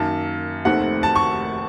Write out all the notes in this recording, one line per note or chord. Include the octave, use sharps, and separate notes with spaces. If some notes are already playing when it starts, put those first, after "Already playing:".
Already playing: F#2 D#3 A#3 A5
F1 D#2 D#3 A3 C4 F#5
A5
C#6